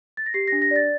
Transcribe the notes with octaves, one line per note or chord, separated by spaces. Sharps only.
A6
A#6
G4 C7
D4 A#6
A#6
D5 A6